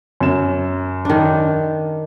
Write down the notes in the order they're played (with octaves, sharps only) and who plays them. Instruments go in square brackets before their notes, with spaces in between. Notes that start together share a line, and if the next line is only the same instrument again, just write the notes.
[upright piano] F#2 E7
[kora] D#3 D4